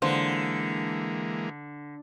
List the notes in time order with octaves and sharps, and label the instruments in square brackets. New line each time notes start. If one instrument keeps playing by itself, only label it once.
[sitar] D3 [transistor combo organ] E3 G#3 A#3 [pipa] B3 F4 C5